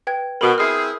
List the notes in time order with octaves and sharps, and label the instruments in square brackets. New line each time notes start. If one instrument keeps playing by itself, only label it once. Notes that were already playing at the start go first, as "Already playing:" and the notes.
[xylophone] B4 G5 G#6
[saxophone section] B2 [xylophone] A#4 B5
[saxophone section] C4 E4 G#4 [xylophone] F6 C7